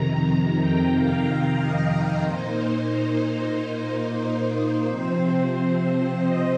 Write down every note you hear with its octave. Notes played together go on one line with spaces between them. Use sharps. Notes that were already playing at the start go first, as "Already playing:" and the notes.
Already playing: F2 C3 D#3 A#5
A#5
G5
F5
D#5
A#2 A#3 D#4 C5
C5
C3 F3 C4
D#5